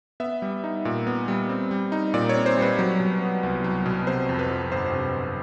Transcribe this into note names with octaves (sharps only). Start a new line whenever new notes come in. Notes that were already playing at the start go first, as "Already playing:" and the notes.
B3 E5
G3
D#4
A#2
B3
G3
C4
G3
D#4
A#2 D5
C#5
C4
C5
G3
B4
F#3
B2
B3
C2
F#3
B2
C3 C5
F2
B4
F3
G1 C5
C3